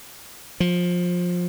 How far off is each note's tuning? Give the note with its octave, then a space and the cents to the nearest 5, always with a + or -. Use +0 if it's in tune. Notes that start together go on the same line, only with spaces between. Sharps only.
F3 +20